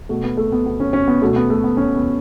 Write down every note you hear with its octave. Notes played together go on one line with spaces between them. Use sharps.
B2 A3
B3
A3
B3
B3
C#4
C#4
B3
B2 A3
B3
A3
B3
C#4
B3